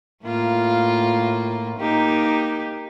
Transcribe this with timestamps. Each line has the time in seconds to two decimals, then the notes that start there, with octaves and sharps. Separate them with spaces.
0.25 A2 A#3 F4
1.78 A#3 D#4 G4